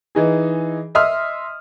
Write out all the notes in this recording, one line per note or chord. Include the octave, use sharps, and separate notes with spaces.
E3 D#4 G#4
D#5 E5 C6 D#6 F6